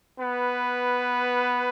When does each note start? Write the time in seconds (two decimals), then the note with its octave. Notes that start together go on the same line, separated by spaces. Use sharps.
0.20 B3 B4